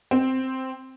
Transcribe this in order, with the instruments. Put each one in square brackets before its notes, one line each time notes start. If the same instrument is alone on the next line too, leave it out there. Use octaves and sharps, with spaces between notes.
[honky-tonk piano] C4